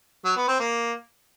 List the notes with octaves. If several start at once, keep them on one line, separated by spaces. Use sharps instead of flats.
F#3
B3
C4
A#3